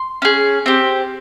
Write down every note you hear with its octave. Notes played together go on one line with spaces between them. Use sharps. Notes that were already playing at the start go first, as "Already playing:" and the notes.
Already playing: C6
C#4 G#4
C4 G4